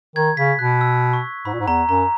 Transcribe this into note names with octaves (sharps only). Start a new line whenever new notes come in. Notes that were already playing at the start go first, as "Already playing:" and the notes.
D#3 G#6
C#3 B6
B2 F#6
E6
C#6
G#2 B5
A#2
G#2
E2 A#5
F#2 A#5